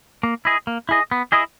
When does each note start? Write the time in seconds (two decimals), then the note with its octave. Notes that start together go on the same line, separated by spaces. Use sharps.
0.23 A#3
0.45 E4 G#4 D#5
0.67 A#3
0.89 E4 G#4 D#5
1.11 B3
1.32 E4 G#4 D#5